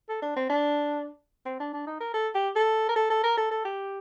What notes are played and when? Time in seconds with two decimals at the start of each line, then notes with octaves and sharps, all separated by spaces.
0.09 A4
0.22 D4
0.36 C4
0.50 D4
1.46 C4
1.60 D4
1.73 D4
1.87 D#4
2.00 A#4
2.14 A4
2.35 G4
2.56 A4
2.89 A#4
2.96 A4
3.10 A4
3.24 A#4
3.37 A4
3.51 A4
3.65 G4